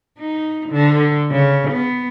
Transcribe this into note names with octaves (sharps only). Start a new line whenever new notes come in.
D#4
D3
C#3
B3